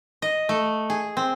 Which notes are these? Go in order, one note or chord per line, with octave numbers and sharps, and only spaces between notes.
D#5
A3
G#4
C4